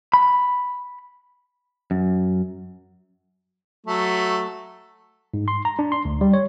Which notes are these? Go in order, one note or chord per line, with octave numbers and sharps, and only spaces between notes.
B5
F#2
F#3 A3
G#2
C6
A#5
D4
C6
D2
G3
C#5